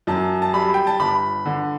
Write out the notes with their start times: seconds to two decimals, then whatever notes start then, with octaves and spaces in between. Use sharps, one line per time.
0.07 F#2 A5
0.42 A5
0.53 G3 B5
0.74 G5
0.87 A5
0.99 G1 B5
1.45 D3